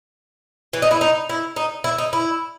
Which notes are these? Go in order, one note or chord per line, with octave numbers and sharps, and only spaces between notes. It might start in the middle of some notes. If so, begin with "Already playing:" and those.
E3
D#4
E4
D#4
E4
D#4
E4
D#4
E4